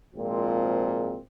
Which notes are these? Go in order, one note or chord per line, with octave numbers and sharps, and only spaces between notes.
G#1 A#2 F3 G#3 C4